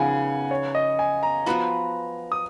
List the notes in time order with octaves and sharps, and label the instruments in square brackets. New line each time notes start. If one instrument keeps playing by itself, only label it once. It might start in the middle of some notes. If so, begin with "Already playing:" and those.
Already playing: [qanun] C#3 F3 B3 D#4 [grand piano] F#5 G#5
[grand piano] C#5
D#5
G#5
A#5
[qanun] F3 B3 F#4 B4
[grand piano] D#6